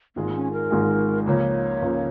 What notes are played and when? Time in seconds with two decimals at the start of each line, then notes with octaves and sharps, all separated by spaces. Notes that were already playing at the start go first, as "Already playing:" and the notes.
0.16 G#1 G#2 G#3 A#3 F4 G#4
0.35 C#4
0.53 A#4
0.71 G#1 G#2 G#3 F4 G#4
1.26 C#2 C#3 F3 A#3 C#5
1.82 C#2 C#3 F3 A#3